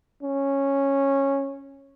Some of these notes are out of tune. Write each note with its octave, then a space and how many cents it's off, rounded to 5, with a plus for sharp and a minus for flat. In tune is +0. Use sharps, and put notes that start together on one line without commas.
C#4 -10